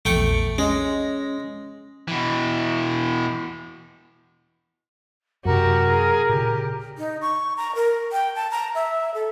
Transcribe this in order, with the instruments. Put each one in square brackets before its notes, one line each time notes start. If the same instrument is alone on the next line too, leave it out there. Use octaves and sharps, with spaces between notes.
[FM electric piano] A#1 E2 [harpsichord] A3 G5 C#6
[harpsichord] G#3 [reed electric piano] C#4 [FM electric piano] D#5 A#6
[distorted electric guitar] B2 E3
[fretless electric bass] F#2 C3 [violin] F#4 G4 [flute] A#4
[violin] G#4
[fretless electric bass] A#2 C#3 [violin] G4
[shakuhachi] D#4
C#6
A#5
A#4
G5
A5
A#5
E5
A4